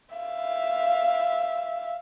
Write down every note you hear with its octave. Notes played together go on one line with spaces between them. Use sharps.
E5 F5